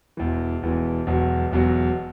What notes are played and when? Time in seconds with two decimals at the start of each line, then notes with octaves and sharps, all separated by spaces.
0.17 E1 E2 E3
0.62 E1 E2 E3
1.07 E1 E2 B2 F#3
1.51 E1 E2 B2 F#3